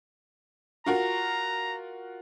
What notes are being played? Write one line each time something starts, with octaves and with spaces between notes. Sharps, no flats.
F4 F#4 A#4 A#5